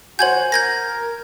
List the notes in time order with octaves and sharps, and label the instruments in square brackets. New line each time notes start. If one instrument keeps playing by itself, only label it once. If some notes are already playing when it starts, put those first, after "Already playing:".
[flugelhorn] F#4 [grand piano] C5 F#5 G#5 [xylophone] G6 G#6 F#7
[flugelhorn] A#4 [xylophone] G6 G#6 A#6